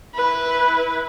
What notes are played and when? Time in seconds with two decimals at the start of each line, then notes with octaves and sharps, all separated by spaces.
0.15 E4 B4